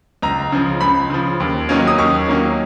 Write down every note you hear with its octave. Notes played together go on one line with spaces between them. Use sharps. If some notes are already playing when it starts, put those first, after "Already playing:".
C#2 A#5
C#3 F3
C#2 B5
C#3 F3
D#2
D#3 F#3 A#3 C#4
D#6
D#2 C#6
D#3 F#3 A#3 C#4